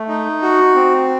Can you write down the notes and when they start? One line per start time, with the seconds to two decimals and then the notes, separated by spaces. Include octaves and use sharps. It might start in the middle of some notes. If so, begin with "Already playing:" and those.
Already playing: A3
0.08 D#4
0.42 F#4
0.75 C4